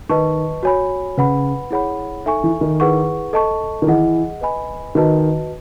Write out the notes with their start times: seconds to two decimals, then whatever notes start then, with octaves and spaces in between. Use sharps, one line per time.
0.09 D#3 B4 D#5 A5 C#6
0.63 F#4 C#5 G#5 B5
1.17 C#3 B4 F#5 B5
1.71 E4 G#4 C#5 F#5 B5
2.26 D#4 A4 E5 G#5 C#6
2.44 E3
2.61 D#3
2.80 E4 G#4 B4 F#5 C#6
3.33 A4 D#5 A5 C#6
3.82 D#3
3.87 E3 G#4 D#5 F#5
4.41 B4 D#5 G#5 B5
4.95 D#3 F#4 B4 D#5 A5